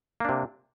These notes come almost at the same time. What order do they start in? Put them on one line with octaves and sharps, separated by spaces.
A#3 D4 C3